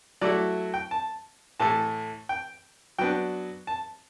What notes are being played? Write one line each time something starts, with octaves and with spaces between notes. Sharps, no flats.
F#3 A3 E4 D5
G5
A5
A2 E3 A3 A5
G5
F#3 B3 D4 G5
A5